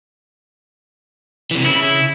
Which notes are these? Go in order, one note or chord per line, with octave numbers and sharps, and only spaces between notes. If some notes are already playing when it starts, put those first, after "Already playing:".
C3 E3
C#3 E4